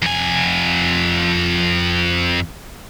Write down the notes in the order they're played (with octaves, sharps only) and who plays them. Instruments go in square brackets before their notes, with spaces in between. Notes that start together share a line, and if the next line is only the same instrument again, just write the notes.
[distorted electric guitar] F2 G#5